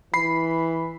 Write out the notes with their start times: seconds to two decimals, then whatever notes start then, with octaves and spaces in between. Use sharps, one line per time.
0.14 E3 B5 C7